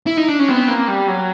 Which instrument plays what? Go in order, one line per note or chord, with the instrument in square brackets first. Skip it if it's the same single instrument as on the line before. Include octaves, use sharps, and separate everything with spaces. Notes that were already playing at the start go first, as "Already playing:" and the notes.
[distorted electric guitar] E4
D#4
D4
C#4
[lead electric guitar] B3 [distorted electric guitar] C4
[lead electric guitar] A#3
G3
F#3